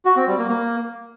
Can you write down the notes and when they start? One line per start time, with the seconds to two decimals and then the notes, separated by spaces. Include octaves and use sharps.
0.05 F#4
0.16 C4
0.27 G3
0.38 A#3
0.49 A#3